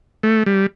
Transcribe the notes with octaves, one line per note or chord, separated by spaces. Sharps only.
A3
G3